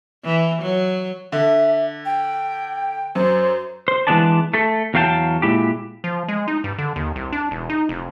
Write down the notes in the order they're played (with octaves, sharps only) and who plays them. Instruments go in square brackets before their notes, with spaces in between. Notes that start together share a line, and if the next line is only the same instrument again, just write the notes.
[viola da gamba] E3
F#3
[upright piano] D3 [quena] E5
[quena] G5
[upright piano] F#2 [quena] C5
[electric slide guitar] C5
E3 G#3 B3 D4 D5 A5
A3 A4
E2 F#3 F5 G5 A5
A#2 G#3 E4 G4
[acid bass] F3
G#3
D#4
G2
D3
D#2
C2
D4
E1
D#4
F1